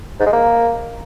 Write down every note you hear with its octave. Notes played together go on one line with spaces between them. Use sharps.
G#2
G#3
A#3